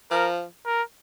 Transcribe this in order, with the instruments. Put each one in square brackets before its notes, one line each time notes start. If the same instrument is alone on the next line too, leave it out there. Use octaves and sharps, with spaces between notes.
[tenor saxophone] F3 [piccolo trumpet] A#4
[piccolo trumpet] A#4